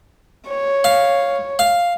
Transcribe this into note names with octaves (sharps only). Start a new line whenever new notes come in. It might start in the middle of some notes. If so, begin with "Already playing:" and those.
C#5
F5
F5